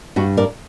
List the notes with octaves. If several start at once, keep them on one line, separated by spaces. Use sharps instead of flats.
G2 F#4
A#4 D5